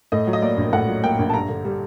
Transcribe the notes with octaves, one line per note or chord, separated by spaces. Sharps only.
A2 D#5
F#3
D#5
A#3 D5
A#1
A2 F#5
F#3
A#3 G5
A#1
A5
G2 A#5
D3
G3